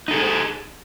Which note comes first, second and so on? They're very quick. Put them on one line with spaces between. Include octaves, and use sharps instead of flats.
D#4 A4 G#4